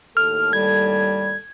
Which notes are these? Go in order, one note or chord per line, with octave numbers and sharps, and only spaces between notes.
D#2 A2 A4 F6
G3 G#6